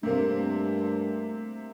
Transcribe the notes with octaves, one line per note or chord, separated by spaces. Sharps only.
G2 C3 A3 A#3 C4